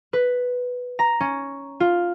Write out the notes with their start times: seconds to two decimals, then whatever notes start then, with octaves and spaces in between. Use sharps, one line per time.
0.13 B4
0.99 A#5
1.20 C#4
1.80 F4